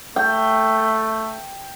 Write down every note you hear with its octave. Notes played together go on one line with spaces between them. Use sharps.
A3 G5